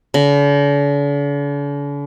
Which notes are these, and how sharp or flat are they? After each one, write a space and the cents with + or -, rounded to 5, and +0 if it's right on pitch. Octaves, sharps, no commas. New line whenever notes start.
D3 -45